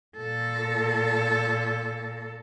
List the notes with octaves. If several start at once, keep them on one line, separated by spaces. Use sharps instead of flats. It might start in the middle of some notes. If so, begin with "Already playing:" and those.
A#2 A4